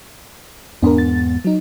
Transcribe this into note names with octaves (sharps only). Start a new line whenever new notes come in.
E2 G#2 B3 D4 A#4
A6
F#3 D#4